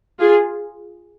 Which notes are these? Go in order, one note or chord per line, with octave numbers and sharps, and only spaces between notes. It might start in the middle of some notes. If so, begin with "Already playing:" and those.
F4 G#4